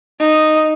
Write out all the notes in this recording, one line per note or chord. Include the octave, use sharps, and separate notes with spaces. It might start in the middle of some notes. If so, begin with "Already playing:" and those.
D#4